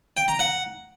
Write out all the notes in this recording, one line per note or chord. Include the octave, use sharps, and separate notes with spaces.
G5
A#5
F#5